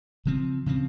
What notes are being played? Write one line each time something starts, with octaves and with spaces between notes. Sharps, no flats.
C#3 F3 C4
C#3 F3 C4